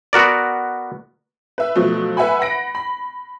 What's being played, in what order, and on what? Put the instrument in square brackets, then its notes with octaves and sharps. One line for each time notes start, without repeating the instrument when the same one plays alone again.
[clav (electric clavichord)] B3 F#4 A#4 D5
[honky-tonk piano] B4 E5
B2 F3 F#3 A3
B4 E5 F#5 G#5 B5
F#5 B5 A#6 D7
B5